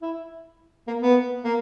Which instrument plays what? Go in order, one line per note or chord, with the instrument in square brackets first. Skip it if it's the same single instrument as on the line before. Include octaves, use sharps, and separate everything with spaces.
[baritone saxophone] E4
A#3
B3
A#3